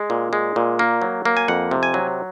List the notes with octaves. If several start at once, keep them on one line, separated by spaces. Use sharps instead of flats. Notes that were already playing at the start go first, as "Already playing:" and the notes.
Already playing: G#3
A#2
G#3
A#2
A#3
F#3
A#3
G#5
F2 F#5
C3
G#5
F#3